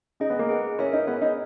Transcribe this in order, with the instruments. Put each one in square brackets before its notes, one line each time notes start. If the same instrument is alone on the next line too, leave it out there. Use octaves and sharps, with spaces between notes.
[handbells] C#4 G#4 D#5 [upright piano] D#4
[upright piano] B3
A#3
[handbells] G#4 B4 F#5
[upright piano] C#4 [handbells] E4 A#4 E5 G#5
[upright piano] D#4
[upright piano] B3 [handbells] G#4 C#5 E5
[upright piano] D#4